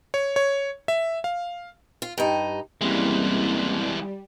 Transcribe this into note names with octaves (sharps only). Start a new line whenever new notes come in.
C#5
C#5
E5
F5
F4
G2 D#4
C2 E3 G3 G#3 A#3 C#4 E4